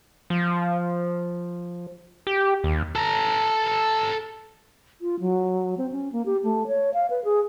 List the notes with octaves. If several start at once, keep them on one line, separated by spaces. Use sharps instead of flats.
F3
G4
D#2
A4 A#5
F4
F#3
C4
C#4
A#3
G4
A3
C#5
F5
B4
G#4